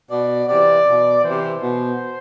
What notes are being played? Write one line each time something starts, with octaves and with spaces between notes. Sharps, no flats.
B2 D5
C3 E3 D5
B2
C3 E3 C5
B2